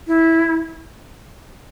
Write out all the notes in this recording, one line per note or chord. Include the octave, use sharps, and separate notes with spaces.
E4